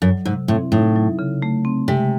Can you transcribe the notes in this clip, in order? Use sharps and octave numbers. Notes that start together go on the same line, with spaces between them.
F#2 F#3
G#2 C3
A2 C4
A2 D#4
F#3
C#3
A3
C4
C3 G#3